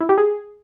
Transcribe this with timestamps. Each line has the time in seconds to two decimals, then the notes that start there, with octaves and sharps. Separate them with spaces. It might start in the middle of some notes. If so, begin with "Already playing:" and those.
0.01 E4
0.09 G4
0.18 G#4